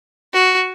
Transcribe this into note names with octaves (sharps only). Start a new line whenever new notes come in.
F#4